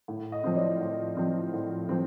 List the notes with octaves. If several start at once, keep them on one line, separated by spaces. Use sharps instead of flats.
A2
D#5
F3 C4
D5
A2
F3 C4
A2
F3 C4